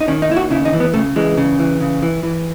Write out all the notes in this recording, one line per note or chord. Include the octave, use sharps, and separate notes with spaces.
D#4
D#3 C#4
D#4
D#2 E4
F#4
C#3 E4
D#4
E3
B3
C#3 A3
E3 G#3
C#3
E3
C#3
E3
E3